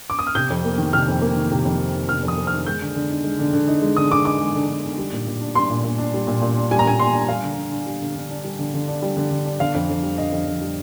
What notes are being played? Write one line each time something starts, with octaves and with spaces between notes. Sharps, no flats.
D6
D#6
F6
C3 G6
F2
A#3
D#3
C3 F6
F2
A#3
D#3
C3
F2
A#3
D#3
C3 F6
F2
D#6
A#3
F6
D#3
G#3 G6
D3
D3
D#4
G#3
D3
D3
D#4
G#3
D3 D#6
D3 D6
D#4 D6
G#3
D3
D3
D#4
G3
A#2
A#2
D4
G3 C6
A#2
A#2
D4
G3
A#2
A#2
D4
G3 G#5
A#5
A#2 G#5
A#2 C6
D4
G3 F5
D3
D3
D4
G3
D3
D3
D4
G3
D3
D3
D4
G3
D3
D3
D4
D3 F5
F2
F2
G3
D3 D#5
F2
F2
G3